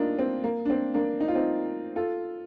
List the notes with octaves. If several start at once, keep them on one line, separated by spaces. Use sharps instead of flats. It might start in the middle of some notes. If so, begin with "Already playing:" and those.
Already playing: A#3 D4 D#4 F4
C4
A#3
D4
C4
A#3 D4
D#4
F4
C4 D#4
F4 A4